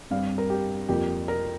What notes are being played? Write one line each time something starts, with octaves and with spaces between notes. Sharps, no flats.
G2 G3 C4 F5
A#4
G4
F2 F3 A#3 G4
A#4